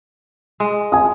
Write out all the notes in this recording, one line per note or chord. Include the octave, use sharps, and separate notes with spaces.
G#3
G#5 D#6